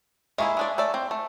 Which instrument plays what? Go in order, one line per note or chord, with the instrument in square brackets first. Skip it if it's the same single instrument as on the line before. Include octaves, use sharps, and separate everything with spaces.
[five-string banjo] G#3 A#3 E4 [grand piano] E5 G#5 C#6
[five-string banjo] G#3 D4 D5
A3 A4 D5
C4
A3